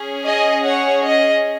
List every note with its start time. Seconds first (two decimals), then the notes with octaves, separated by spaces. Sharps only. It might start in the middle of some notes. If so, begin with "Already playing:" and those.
Already playing: C#4 G#4
0.24 D#5 G#5
0.64 C#5 F#5
1.04 D#5